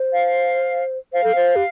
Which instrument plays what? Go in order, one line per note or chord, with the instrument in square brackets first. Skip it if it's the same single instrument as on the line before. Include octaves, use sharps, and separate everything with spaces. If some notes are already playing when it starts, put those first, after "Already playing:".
Already playing: [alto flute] C5
[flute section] F5
[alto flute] C5 [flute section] F5
[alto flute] A4
C5
G4